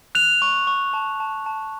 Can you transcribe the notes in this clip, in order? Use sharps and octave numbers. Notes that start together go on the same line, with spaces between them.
F#6 F7
C#6
C#6
A5
A5
A5